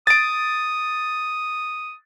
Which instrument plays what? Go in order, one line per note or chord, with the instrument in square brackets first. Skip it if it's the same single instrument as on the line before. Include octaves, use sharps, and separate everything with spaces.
[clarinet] D#6 [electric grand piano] A6 D7